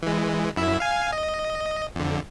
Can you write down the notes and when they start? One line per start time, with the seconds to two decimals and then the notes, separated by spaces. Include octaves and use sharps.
0.02 E3 G#3
0.56 F#2 E4 E5
0.80 F5 G#5
1.13 D#5
1.96 F2 D3